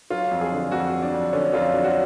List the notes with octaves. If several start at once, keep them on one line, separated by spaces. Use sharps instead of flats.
F#3 F4
F2
G#4
D3
F2 F#4
F#3
D4
F2
D3 C#4
F2 F4
F#3 D4
F#4